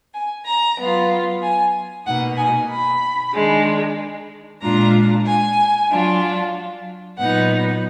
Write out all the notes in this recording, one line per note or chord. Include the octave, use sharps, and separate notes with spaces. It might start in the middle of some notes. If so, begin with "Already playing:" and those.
G#5
A#5
F#3 B3 F4
G#5
B2 A#3 D#4 F#5
G#5
B5
D#3 G#3 D4
A#2 G#3 D4 F4 A#5
G#5
F#3 D4 F4
A#2 F#3 B3 D#4 F#5